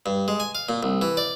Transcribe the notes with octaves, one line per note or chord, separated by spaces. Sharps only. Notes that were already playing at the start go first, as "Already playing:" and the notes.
G2
G#3
G#5
F5
A#2
C2
E3
D5